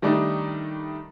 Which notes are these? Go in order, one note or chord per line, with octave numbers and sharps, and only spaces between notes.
D#3 G3 A3 D4 D#4